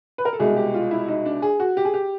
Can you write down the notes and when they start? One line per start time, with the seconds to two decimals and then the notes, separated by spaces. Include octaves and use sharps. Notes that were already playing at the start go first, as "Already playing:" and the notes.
0.18 B4
0.25 A#4
0.33 A4
0.39 C2 B2 G#3 G#4
0.56 G4
0.74 F4
0.91 E4
1.08 D#4
1.25 D4
1.42 G#4
1.60 F#4
1.77 G4
1.85 G#4
1.94 G4